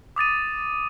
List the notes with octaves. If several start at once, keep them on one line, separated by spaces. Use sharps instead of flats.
D6 D#6 A6 D#7